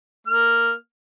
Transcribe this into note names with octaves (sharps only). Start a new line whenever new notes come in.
A#3 F6